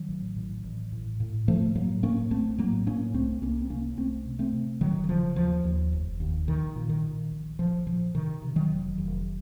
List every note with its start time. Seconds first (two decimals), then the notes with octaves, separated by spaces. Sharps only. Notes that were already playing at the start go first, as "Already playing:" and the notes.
Already playing: D#3 F#3
0.09 A1
0.36 A2
0.64 A1
0.92 A2
1.20 A2
1.48 A2 F3 A3
1.75 A2 F#3 A#3
2.03 A2 A#3 C#4
2.30 A#1 A3 C4
2.58 A2 F#3 A#3
2.86 A2 A#3 C#4
3.14 C2 A3 C4
3.42 C2 A#3 C#4
3.62 C4
3.70 C3 A#3 C#4
3.97 C2 A3 C4
4.25 C3
4.39 A3 C4
4.53 C3
4.81 F1 D#3 F#3
5.04 D#3
5.09 C#3 F3
5.36 D#2 F3
5.64 D#2
5.92 F1
6.20 D#2
6.47 A#1 D#3
6.76 A#2
6.89 D#3
7.03 A#2
7.31 A#1
7.59 A#1 F3
7.87 A#2 F3
8.15 C3 D#3
8.42 C3
8.56 D#3 F#3
8.70 F1
8.98 F1